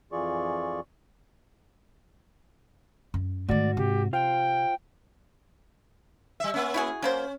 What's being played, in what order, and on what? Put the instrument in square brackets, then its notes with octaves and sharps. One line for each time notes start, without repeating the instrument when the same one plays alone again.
[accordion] F2 E3 F4 G#4 D5 C#6
[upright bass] F#2
[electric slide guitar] G#2 F#4 [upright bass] D#3 A3 [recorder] D5
[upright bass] C3 [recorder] G4
[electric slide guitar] F4 C5 F5 [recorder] G5
[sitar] G3 E5
A#3 C#4
[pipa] E4 F#4 G#4
[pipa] F#3 A#3 C5 [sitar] C#4